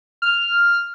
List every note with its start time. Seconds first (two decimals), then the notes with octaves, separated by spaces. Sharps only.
0.22 F6